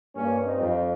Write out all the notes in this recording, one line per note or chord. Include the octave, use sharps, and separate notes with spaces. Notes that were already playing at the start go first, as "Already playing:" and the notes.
G2 A#3 C#4
C4 D#4
F2